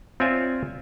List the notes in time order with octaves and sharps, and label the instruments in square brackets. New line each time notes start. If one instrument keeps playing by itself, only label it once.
[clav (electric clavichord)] C4 F4 C#5 D5 E5 G#5